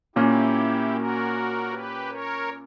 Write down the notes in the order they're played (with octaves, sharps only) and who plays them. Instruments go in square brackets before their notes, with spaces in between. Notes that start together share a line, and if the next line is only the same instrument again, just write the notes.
[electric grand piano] A#2 A#3 C#4 [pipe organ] E4 G4
[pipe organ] F#4 A#4
G4 B4
A#4 C#5